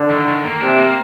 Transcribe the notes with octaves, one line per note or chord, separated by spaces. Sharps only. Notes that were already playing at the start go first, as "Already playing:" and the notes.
Already playing: D3
D#3
D#3
A#3
C3 D4
A#3